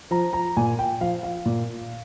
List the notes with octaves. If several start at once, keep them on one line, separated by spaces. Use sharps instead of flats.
F3 A#5
A#5
A#2 G#5
G5
F3 F5
F5
A#2